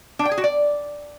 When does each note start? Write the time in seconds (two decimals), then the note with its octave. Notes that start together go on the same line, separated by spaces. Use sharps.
0.19 D4
0.25 G5
0.31 G#4
0.38 F#4
0.44 D5